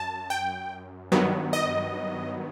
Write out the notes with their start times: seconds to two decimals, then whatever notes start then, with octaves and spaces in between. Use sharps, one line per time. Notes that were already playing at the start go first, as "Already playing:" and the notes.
Already playing: F#2 A5
0.30 G5
1.12 G2 D#3 F#3 B3
1.53 D#5